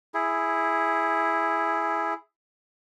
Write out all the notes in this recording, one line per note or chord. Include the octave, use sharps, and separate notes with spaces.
E4 G#4